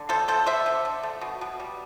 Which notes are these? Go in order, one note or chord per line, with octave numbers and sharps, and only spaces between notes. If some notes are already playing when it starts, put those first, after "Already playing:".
Already playing: D3
A3 A4 C5
A3 A4 C5
D3 C5 E5
D3
D3
A3
B2
B2
G3